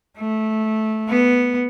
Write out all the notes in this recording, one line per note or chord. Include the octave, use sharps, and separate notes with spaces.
A3
B3